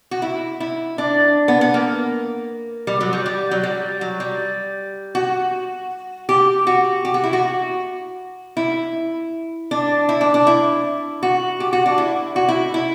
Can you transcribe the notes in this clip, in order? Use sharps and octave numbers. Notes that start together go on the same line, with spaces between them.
F#4
E4
E4
D4
B3
B3
A#3
G3
F#3
G3
G3
F#3
G3
F#3
G3
F#4
G4
F#4
G4
F#4
E4
F#4
E4
D4
E4
D4
D4
E4
F#4
G4
F#4
D4
E4
F#4
E4
E4